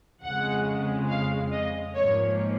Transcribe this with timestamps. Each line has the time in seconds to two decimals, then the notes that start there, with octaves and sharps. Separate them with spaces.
0.23 F2 C#3 G#3 F#5
1.09 F5
1.52 D#5
1.95 G#2 F3 A#3 C#5